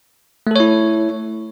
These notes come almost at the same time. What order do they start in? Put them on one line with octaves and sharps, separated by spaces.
A3 A4 C#5 E4